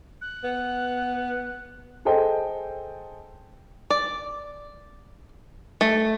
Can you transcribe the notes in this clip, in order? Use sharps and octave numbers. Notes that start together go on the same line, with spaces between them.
F#6
B3
G#4 A4 C5 D#5 G5
D5
A3